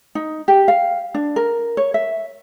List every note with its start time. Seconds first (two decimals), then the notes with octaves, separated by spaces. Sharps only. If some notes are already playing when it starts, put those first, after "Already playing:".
0.15 D#4
0.48 G4
0.68 F5
1.14 D4
1.36 A#4
1.77 C#5
1.94 E5